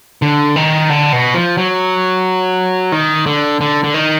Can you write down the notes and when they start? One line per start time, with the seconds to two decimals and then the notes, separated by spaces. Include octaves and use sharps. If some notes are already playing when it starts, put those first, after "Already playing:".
0.22 D3
0.56 D#3
0.90 D3
1.13 B2
1.34 F3
1.58 F#3
2.92 D#3
3.26 D3
3.61 D3
3.84 D3
3.94 D#3